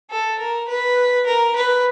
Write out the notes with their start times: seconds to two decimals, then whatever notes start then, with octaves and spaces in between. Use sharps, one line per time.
0.10 A4
0.39 A#4
0.68 B4
1.26 A#4
1.56 B4